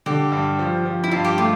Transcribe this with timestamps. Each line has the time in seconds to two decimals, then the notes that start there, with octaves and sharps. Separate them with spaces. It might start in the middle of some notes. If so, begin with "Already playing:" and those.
0.06 D3 G4
0.32 G2
0.59 F3
0.85 F3
1.04 E4
1.11 G2 F4
1.25 G4
1.38 A3 F4